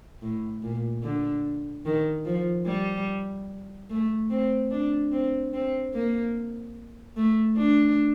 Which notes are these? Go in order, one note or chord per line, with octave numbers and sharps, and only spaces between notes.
A2
A#2
D3
D#3
F3
G3
A3
C4
D4
C4
C4
A#3
A3
D4